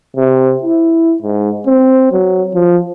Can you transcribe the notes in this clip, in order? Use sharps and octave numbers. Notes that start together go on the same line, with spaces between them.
C3
E4
G#2
C4
F#3
F3